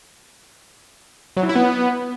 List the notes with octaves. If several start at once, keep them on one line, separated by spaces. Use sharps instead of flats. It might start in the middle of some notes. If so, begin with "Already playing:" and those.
F#3
E3
E4
B3